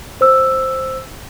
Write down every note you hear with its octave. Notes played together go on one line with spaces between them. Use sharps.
C5 E6